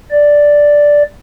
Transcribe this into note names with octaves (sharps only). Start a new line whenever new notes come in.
D5